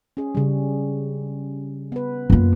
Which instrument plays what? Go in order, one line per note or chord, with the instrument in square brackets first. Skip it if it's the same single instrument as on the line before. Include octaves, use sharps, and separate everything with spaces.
[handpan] C#4 G#4
C#3 G3
B3 B4
[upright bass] F#2 A#3 [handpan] F4